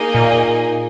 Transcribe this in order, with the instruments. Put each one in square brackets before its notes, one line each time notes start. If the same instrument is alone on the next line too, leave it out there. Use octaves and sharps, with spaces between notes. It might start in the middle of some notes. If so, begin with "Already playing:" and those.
Already playing: [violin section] A#3 D#4 G#4 D#5 G#5
[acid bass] A#2